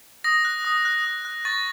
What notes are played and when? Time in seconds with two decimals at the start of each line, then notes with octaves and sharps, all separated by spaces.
0.24 D#6 A#6
0.45 F#6
0.65 D#6
0.85 F#6
1.05 D#6
1.25 F#6
1.45 C#6 A6